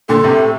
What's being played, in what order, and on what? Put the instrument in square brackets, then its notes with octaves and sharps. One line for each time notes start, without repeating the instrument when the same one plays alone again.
[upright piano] A#2 D3 [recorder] A4
[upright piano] A2 C3